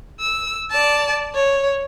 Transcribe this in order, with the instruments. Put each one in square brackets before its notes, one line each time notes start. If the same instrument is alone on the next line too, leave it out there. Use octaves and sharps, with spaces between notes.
[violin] E6
D5 A5
C#5